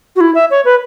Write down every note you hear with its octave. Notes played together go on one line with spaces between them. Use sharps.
F#4
E4
E5
C#5
B4